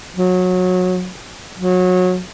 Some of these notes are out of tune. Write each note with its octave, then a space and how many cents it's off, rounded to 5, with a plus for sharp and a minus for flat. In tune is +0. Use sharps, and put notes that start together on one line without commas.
F#3 -20
F#3 -25